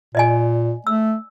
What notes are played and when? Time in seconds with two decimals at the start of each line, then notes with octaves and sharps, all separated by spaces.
0.15 A#2 D5 D#5 G#5
0.87 A3 E6